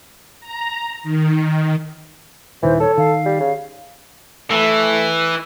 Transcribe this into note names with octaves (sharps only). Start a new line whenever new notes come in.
A#5
D#3
D#1 D#3 E3 C5
A4 C#5
D#3 F5
G3
C#3
E3 A3